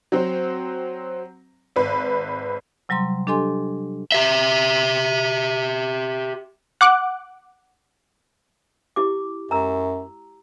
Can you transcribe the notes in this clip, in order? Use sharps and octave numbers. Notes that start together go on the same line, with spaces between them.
F#3 C4
G#1 B4
C3 F#3 G3 A#5 C6
D4 G4 A4 D#5 G#5 C6
G4 E5
F#5 D6 F#6
E4 G4 D6
F#2 A#5 E6